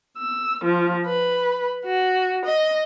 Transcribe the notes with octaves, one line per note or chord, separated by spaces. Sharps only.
E6
F3
B4
F#4
D#5